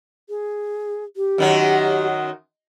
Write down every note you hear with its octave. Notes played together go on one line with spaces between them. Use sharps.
G#4
G4
F#2 D#3 F#3